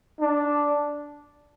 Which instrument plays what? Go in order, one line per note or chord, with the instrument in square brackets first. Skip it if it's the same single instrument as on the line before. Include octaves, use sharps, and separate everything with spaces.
[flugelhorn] D4